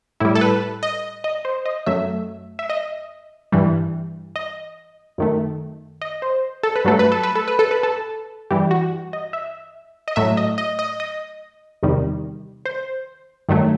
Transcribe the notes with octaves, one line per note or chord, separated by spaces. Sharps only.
A2 G3 E4
A4
B4
D#5
D#5
C5
D#5
F#2 F#3 A3 E5
E5
D#5
G2 E3 G3
D#5
F#2 D#3 A3
D#5
C5
A4
B4
G2 F#3 A3 A4
B4
A4
B4
A4
B4
A4
B4
A4
G2 E3 G3 G4
F#4
D#5
E5
D#5
A2 F#3 A3 E5
D#5
D#5
D#5
D#5
E2 C3 D#3 G3
C5
G2 D#3 F#3 A3